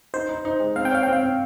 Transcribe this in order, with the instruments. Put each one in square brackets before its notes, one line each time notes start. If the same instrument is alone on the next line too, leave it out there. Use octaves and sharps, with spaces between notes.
[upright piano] D#4 [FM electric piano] C5
[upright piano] D#4
D#4
G#3
[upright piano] C4 [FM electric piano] F5
[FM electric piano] G5
[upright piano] C#5 [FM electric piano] F5
[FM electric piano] G5
[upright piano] C4
[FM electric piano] F5
[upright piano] C4